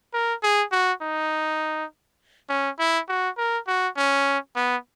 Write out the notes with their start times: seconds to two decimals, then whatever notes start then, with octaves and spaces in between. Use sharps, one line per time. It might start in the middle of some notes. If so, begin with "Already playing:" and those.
0.14 A#4
0.43 G#4
0.72 F#4
1.02 D#4
2.50 C#4
2.79 E4
3.09 F#4
3.38 A#4
3.68 F#4
3.97 C#4
4.56 B3